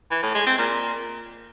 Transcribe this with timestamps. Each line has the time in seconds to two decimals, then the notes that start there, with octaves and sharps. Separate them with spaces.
0.11 E3
0.23 A2
0.34 G#3
0.46 C4
0.58 A#2